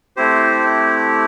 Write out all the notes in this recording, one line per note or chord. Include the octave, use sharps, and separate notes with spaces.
A3 C4 E4 G4 C5